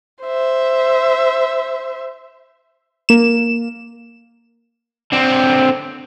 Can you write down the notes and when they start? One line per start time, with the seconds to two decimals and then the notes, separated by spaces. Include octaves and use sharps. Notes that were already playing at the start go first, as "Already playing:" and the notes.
0.23 C5 E5
3.09 A#3 E7
5.12 D3 C4